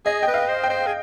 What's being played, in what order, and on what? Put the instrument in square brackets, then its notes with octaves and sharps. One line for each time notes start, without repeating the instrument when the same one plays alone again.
[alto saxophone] G#4 [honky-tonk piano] D#5
[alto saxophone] B4 [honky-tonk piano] G5
[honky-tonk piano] F5
[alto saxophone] C5
[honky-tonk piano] G5
[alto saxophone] C5
G#4